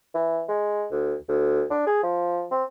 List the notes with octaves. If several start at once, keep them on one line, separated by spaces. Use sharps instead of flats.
E3
G#3
D2
D2
D4
G#4
F3
C4